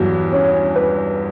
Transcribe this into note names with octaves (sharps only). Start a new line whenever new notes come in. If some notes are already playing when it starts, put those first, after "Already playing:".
Already playing: E2 G2 F#3
C#4
B4